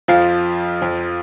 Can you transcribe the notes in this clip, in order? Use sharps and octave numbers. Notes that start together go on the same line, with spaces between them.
F2 F3 F5
F2 F3